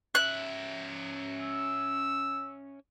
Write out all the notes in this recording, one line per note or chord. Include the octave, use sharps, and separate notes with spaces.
C#4 E5 F#6
E6